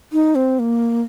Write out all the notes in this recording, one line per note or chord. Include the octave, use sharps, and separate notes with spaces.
D#4
C4
A#3